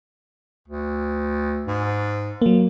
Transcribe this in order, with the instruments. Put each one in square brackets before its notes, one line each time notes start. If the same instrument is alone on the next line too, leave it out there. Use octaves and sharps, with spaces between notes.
[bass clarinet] D2
G#2
[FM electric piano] F#3 A#3